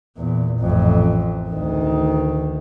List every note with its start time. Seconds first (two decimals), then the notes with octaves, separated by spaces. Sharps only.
0.17 E2 A#2
0.59 A1 F2
1.50 D2 D#3